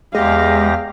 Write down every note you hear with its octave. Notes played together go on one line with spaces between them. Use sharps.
E2 G#3 G4 F5 A#6